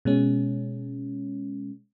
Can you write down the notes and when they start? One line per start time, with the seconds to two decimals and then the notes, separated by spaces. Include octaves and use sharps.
0.05 B2 G#3 C#4